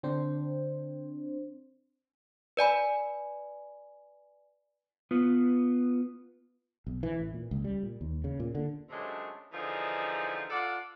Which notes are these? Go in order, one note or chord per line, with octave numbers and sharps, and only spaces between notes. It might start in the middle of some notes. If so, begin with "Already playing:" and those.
D3 C4 D4 C5
B4 D5 G#5 B5
B3 F4 B4
B1
E3
A1
A#2
C#2
G3
A#2
D#2
C#3
A#2
D3
F#2 C3 G#3 A3 D4
D3 E3 F3 D#4 G#4
F4 A4 D5 F5 F#5